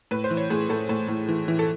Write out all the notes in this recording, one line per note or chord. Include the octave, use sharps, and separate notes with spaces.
A2 B4
C5
E3
C#5
A2 G#4
A2 A4
A2
A2
E3
E3
A4